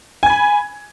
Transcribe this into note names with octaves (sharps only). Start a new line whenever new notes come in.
G#5 B5 G#6